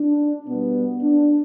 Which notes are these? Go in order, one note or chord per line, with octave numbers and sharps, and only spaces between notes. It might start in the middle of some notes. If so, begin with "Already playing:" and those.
Already playing: D4
B2 G3 B3
D4